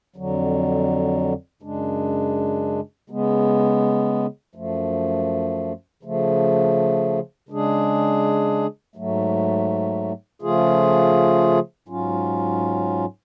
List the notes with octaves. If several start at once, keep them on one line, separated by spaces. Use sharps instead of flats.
F2 D3 F#3
F#2 C#3 G#3 D4
C#3 G#3 B3
F#2 F3 A3
C#3 F3 A3
C#3 G#3 D4 G#4
G#2 F#3 A3
C#3 F3 A3 F4 G#4
G#2 F#3 C#4 F4